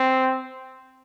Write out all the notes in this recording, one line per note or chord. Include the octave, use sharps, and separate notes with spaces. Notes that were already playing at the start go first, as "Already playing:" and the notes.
Already playing: C4